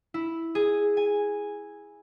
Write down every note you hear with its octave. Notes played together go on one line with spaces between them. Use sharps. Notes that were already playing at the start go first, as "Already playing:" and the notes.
E4
G#4
G#5